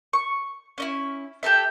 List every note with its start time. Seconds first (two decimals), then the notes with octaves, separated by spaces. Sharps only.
0.13 C#6
0.78 C#4 D#4 E4
1.43 G4 A4 A#4 E5